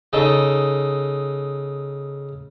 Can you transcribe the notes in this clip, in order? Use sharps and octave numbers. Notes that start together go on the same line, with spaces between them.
C#3 D#4 A4